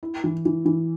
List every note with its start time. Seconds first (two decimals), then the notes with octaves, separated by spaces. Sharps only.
0.03 E4
0.24 E3
0.45 E3
0.65 E3